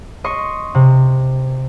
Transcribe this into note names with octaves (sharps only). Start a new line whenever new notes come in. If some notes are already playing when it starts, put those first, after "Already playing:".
D#5 C6 C#6
C3